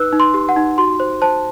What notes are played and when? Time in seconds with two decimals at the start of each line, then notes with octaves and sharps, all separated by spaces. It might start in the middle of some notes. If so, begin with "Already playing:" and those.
Already playing: D#4 B4 E6 F#6
0.13 D#4
0.20 C6
0.34 G4
0.49 F#5
0.56 D#4
0.78 F#4 C6
1.00 C5
1.22 C5 A5